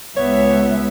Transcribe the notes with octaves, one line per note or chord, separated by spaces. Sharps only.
C#2 B3 C#5 E5